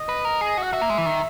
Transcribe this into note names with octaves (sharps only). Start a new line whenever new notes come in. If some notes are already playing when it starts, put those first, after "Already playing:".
Already playing: D#5
B4
A#4
G#4
F#4
F#5
F#4 E5
A#3
G#3
E3
D#3